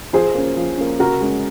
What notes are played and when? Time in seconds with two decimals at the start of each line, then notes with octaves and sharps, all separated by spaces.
0.13 F3 G#4 C5
0.34 A#3 C#4
0.56 F3
0.77 A#3 C#4
0.99 C#3 F#4 A#4
1.21 G#3 C#4